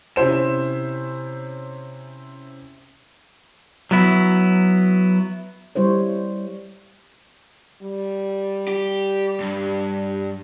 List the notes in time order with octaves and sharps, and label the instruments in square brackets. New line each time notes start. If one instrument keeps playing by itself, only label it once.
[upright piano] C3 C#4 E4 C5 E7
[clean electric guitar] F#3 B3 E4
[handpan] G3 E4 C5 C#5
[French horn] G3
[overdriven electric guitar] G4
G2